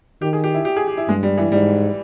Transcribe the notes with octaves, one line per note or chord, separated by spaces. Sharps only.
D#3 G4
G#4
G4
E4
G4
G#4
G4
E4
G2 G#3
G3
E3
G#2 G3